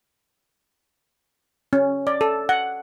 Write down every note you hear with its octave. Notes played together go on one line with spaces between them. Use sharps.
C#4
D5
A4
F#5